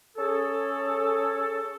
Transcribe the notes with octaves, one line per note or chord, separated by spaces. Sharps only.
C#4 G#4 A4